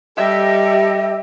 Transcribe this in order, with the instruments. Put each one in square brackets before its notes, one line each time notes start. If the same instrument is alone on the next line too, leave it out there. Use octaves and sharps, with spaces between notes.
[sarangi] G3 [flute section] G4 A4 D#5 [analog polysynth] E5